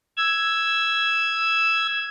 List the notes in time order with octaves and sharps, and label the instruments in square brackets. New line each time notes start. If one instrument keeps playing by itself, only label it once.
[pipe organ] E6 G#6